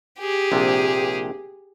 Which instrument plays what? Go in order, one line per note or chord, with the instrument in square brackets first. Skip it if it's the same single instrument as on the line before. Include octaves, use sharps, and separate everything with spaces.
[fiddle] G4 G#4
[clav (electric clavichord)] A#1 C3